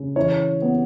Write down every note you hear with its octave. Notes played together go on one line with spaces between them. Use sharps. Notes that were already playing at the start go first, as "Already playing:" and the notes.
Already playing: C#3
E3 C#5
B3